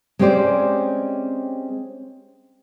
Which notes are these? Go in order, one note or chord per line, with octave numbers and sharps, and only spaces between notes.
G#3 C4 C#4 G4 C5 D5